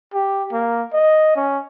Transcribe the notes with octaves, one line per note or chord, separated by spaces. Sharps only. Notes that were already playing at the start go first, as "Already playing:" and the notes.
G4
A#3
D#5
C#4